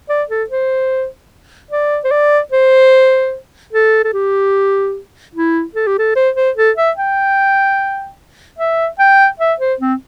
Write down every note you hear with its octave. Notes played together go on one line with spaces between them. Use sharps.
D5
A4
C5
D5
C5
D5
C5
A4
A4
G4
E4
A4
G4
A4
C5
C5
A4
E5
G5
E5
G5
E5
C5
C4